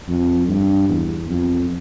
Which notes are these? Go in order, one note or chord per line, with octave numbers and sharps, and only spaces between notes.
F2
G2
E2
F2